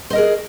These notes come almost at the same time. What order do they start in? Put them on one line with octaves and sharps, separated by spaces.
C5 D#5 A#4 G#4